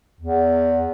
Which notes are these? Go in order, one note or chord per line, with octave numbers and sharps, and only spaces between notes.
E2